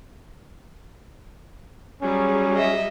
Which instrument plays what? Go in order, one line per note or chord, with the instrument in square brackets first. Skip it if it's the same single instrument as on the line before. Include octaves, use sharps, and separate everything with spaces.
[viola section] F#3 G3 G#4 [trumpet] C#4
[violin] D#5 E5